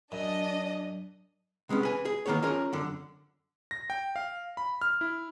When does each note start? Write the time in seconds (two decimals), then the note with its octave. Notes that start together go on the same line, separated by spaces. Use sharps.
0.12 F#2 D4 D#5
1.69 C3 G#3 B3 C#4
1.83 B4 G#5
2.05 G#4
2.26 D#3 A#3 B3 G#4 C#5
2.42 C#4 F4 G#4 A#4 C#5
2.73 F#2 D3
3.71 A#6
3.90 G5
4.16 F5
4.57 B5
4.82 F6
5.01 E4